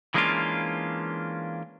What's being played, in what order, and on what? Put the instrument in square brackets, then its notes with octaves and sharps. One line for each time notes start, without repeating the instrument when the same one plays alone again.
[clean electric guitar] E3 G#3 A#3 C#4 D4 F4